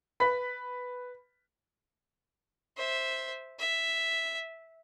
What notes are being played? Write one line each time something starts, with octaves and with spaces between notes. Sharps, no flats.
B4 B5 B6
C5 E5
E5